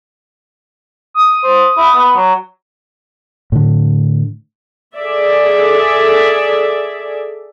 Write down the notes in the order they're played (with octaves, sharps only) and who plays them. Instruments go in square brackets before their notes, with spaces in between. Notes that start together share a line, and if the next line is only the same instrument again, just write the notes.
[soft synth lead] D#6
[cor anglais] C5
E4
B3
F#3
[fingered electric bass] A2 D3
[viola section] G#4 A4 D5 E5